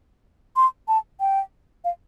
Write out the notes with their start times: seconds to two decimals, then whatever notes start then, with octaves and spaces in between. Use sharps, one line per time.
0.56 C6
0.88 A5
1.20 G5
1.84 F5